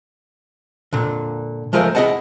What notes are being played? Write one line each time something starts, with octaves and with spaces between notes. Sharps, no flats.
A#2 D3
F3 G#3 A3 A#4 C5 F5
E4 G#4 C5 D#5 F#5 A5